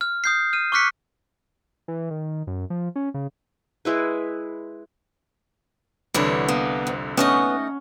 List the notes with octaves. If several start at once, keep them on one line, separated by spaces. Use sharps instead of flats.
F6
D#6 G6 C7
F6 D#7
C#6 D6 F6 F#6 B6 C#7
E3
D#3
F#2
F3
C#4
C#3
G#3 E4 B4
C2 D3 E3 D4 C#5
A#3 B3
F2
A3 B3 C#4 D#4 D#5